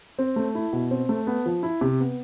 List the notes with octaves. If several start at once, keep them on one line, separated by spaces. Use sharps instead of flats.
C4
A3
E4
B2
C4
A3
B3
F3
E4
C3
B3